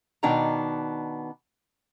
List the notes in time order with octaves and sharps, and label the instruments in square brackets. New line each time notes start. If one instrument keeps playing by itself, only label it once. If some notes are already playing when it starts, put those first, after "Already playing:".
[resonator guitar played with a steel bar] B2 D#3 B3 D4 D#4 A#5